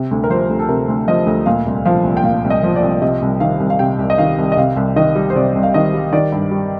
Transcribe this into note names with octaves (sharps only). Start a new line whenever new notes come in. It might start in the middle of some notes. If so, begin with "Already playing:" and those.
Already playing: C3
D2
A#4
F3 C5
D2
A4
C3 A#4
D2
F3 D#5
D2
A#2 F5
C2
F3 F5
C2
G5
A#2 F5
C2
D#5
F3
D5
C2
C3 D#5
C2
D#3 F5
C2
F5
C3 G5
C2
D#5
D#3 F5
C2
D#5
C3 F5
C2
D#3 D#5
G3
C5
C3 D5
C2
F5
D#3 D#5
G3
D#3 D5
G2
G3